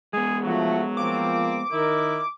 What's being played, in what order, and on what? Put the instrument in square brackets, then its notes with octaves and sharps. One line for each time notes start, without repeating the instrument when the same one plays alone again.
[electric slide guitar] G#3 B3 [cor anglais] G#4
[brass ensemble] F3 A3 F#4 [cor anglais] F#3
[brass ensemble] F3 A#3 C4 [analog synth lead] D6
[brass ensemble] D#3 A#4 D#5 [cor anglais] E4